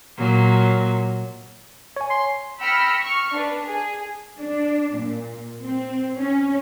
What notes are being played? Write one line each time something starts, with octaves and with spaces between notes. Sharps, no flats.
A#2 F#3
C#5 G#5
C6
G5 B5 E6 F6 A#6 C#7
C#6 F6
D4 B4
G#4
D4
A#2
C4
C#4